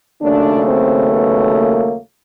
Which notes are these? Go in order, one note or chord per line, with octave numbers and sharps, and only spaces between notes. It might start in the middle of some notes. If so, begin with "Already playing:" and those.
D#2 C#3 F#3 A3 D4
C4
B3
A#3